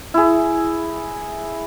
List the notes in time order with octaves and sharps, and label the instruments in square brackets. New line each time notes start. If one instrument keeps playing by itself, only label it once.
[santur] E4 G#4